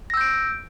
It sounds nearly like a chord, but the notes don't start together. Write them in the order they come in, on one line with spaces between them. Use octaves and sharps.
A#6 E6 G6 D7